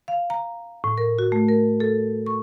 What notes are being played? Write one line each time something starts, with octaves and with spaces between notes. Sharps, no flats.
F5
A#5
A2
A#4
F#4
A3
A#4
A4
C#6